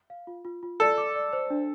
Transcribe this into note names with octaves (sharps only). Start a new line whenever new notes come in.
F5
F4
F4
F4
A4 D5
D6
D5
C5
D4